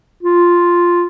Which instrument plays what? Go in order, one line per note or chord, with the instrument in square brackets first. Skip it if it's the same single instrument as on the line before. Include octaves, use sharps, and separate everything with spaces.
[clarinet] F4